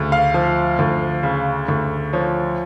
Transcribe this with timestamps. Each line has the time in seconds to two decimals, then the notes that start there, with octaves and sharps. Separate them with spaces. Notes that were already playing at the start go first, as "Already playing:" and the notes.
Already playing: D2 C#3
0.12 F5
0.34 F3
0.79 D2
1.23 C#3
1.68 D2
2.13 F3 C#5